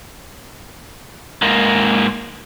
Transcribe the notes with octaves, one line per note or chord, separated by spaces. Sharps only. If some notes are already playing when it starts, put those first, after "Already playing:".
G#2 A#3